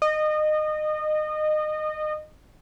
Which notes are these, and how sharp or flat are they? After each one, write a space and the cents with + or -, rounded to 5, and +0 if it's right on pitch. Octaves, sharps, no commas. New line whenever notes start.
D#5 -25